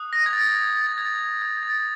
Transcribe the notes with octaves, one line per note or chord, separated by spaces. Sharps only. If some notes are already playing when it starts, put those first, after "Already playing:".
Already playing: D#6 F#6
A#6
G#6
A6
G#6
A6
G#6
G#6
G#6
A6